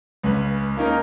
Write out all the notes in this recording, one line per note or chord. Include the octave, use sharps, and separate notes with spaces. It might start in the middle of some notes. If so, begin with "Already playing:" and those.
C#2 C#4 B4
A#3 C#4 D#4 A#4